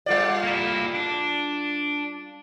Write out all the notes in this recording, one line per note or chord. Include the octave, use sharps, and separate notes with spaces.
G3 F4 D5
A#3 E4
D4